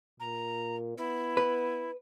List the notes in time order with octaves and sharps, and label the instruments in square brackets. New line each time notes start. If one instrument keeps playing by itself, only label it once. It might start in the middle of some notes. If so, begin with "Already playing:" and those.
[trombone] A#2 [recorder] A#5
[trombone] B3 [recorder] E4
[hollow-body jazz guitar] B4